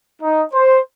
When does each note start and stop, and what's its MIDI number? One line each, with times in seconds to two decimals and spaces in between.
0.21 0.43 63
0.53 0.79 72